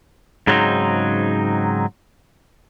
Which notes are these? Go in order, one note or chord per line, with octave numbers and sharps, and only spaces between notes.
G#2 C#3 F#3 B3 C4 D#4